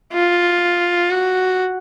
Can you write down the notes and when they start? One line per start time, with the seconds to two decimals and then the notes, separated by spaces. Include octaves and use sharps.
0.13 F4
1.11 F#4